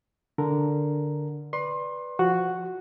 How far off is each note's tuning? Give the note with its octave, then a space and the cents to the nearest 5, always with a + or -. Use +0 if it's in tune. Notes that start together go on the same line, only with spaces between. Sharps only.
D3 +0 A#4 +0
B4 +0 D5 +0 C6 +25
F3 +0 F#4 +0